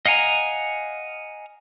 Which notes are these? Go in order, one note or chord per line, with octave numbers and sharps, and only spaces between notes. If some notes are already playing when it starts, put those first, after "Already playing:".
D#5 F5 F#5 G#5 A#5